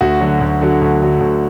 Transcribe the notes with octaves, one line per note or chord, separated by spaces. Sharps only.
D2 F#4
D3 F#3
D2
D3 F#3
D2
D3 F#3
D2